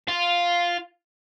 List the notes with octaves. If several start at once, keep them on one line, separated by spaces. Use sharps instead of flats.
F4